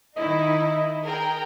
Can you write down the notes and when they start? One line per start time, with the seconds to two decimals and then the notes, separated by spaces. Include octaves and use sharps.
0.17 D#3 D#4 E4 D#5
1.04 G#4 A#4 G5